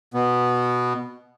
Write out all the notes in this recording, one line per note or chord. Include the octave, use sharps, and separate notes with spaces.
B2 B3